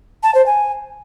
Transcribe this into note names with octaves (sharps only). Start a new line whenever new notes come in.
A5
C5
G#5